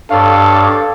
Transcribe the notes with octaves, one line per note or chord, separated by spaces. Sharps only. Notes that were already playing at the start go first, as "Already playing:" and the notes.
G2 A4 C#5 D5 F5